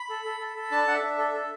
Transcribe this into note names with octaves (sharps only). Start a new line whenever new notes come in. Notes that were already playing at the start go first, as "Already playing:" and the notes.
Already playing: B5
A4
A4
A4
A4
D4 A5
D4 F#5
E5
D4
A4
A4